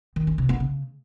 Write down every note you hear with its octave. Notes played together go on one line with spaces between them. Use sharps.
D#3
C#4
C3
B3
C#3